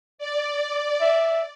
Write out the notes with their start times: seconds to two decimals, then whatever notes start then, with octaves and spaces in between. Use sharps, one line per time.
0.18 D5
1.01 E5